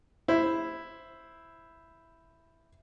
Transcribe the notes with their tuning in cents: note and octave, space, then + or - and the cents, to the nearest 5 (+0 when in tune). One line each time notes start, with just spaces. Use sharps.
E4 +0 C5 +0